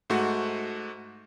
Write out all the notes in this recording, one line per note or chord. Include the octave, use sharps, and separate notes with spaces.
G#2 A3 F#4